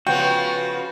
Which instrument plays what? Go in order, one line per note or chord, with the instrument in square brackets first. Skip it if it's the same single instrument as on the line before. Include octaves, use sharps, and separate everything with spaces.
[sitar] C#3 F3 B3 [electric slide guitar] F#4 [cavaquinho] G5